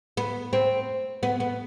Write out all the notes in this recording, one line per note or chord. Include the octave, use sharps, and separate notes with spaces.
B3
C4
B3
B3